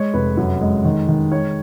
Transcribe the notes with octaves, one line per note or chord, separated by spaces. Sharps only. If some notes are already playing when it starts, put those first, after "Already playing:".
Already playing: G#3 C#5
F1 B4
F#2
G#3
D#3
D#3
G#3 C#5